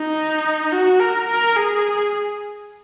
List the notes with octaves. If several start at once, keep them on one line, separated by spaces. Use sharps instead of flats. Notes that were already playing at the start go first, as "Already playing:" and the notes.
Already playing: D#4
F#4
A#4
A#4
G#4